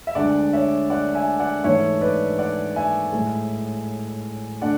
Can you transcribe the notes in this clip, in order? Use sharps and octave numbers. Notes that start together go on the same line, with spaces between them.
E5
D2 D3 G#3 D5 F#5
C#5 E5
D5 F#5
E5 G#5
D5 F#5
G#2 E3 A3 C#5 E5
B4 D5
D5 F#5
E5 G#5
A2 G#3
D3 A3 D5 F#5